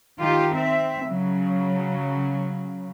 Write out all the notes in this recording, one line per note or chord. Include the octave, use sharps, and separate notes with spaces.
D#3 F4 G4
C4 E5
C#3 F#3